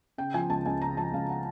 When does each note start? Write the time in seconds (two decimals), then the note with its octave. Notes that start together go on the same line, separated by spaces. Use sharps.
0.18 C#3 G5
0.34 F3 G#5
0.50 C#2 A5
0.66 C#2 G#5
0.81 C#3 A#5
0.97 F3 A5
1.13 C#2 F5
1.30 F#5